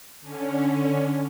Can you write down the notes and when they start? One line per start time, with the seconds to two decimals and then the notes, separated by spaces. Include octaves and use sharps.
0.21 D3 C#4